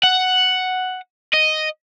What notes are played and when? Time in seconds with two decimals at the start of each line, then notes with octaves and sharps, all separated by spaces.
0.03 F#5
1.34 D#5